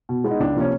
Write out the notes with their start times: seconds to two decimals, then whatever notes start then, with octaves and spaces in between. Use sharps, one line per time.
0.09 B2
0.24 G#3 B3
0.31 D#4
0.40 C#2 D4
0.56 C3 F3 A#3 C#4